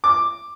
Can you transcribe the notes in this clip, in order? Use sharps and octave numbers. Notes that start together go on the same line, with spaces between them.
D6